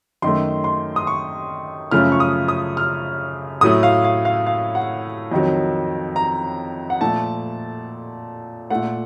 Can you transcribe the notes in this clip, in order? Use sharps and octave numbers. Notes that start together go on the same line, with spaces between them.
F#2 D#3 A3 C6
C6
D#6
C#6
F#2 C#3 F3 A3 F6
C#6
D#6
D#6
F6
A2 F#3 A3 D#6
F5
F5
F5
F5
F#5
F2 D#3 F#3
A#5
F#5
A#2 F3 A3 A5
A#2 A3 F#5